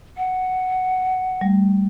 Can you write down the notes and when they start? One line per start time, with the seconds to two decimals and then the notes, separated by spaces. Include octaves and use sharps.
0.17 F#5
1.41 G3 A3